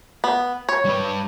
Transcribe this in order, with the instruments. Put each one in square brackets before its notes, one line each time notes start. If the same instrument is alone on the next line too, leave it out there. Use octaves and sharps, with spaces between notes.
[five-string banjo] B3
C#5
[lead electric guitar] G3 B4